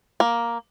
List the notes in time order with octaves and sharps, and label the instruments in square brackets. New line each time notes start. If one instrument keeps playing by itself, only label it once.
[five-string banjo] A#3